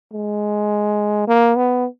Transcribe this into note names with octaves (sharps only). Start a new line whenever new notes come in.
G#3
A#3
B3